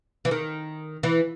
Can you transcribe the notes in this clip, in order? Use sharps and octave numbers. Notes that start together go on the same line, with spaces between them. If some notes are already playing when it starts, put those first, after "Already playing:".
E3
D#3
E3